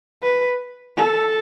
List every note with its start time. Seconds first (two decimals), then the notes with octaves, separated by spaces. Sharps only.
0.23 B4
0.97 A4